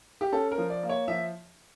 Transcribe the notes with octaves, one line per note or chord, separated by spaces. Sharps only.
G4
C#4 A4
A#4
F3
D5
A#3
C#5
F3 E5